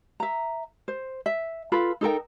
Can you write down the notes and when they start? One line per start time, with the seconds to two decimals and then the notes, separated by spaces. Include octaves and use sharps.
0.20 E5 A#5
0.88 C5
1.26 E5
1.72 F4 A4 B4 B5
2.01 D#4 A4 A#4 G5